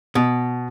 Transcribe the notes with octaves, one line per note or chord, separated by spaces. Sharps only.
B2